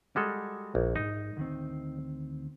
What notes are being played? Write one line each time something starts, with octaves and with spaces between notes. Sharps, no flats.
G3 G#3 F#4 A4
A#1
E2 G#2 D#4
D2 D#3 C4